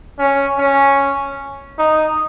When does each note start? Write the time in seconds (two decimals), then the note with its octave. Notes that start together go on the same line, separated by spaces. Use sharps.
0.19 C#4
0.58 C#4
1.78 D#4